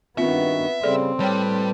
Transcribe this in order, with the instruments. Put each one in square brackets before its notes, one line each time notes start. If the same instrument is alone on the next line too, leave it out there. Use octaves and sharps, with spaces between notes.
[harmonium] G2 D#3 F#4 [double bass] B3 [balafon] C4 F4 [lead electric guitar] E5
[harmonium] C#3 G3 [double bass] C4 [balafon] G#4 A4 D5
[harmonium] A2 B4 A5 [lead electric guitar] G3 [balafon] C#5 G5